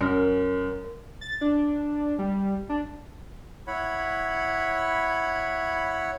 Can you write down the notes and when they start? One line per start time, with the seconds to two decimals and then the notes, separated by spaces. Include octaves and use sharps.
0.01 F#2 A#4
1.21 A6
1.41 D4
2.19 G3
2.69 D4
3.67 E4 C#5 F#5 B5